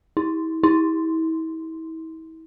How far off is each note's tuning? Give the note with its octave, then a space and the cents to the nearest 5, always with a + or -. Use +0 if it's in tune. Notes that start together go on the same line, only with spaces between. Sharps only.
E4 -40
E4 -35